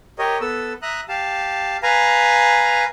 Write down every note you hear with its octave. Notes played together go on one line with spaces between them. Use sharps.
G4 A#4 C#5 D#5
B3 A4 E6
E5 A#5 D#6 F#6
G4 F5 A5
B4 F5 G#5 A#5